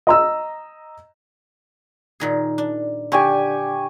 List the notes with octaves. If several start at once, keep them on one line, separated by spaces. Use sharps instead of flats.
D#5 A#5 E6
A#2 D#3 G#4
D4
D3 G4 G#5 C#6